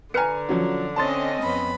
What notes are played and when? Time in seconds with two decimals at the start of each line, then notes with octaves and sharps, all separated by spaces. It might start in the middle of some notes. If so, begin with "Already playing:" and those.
0.14 D3 B4 G#5 A#5 F6 C#7
0.49 F3 F#3 C#4
0.96 C4 C#4 D#5 A5 C6 A6
1.42 F2 B3 B5